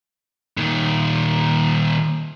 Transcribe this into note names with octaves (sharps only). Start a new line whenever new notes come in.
A#2 D#3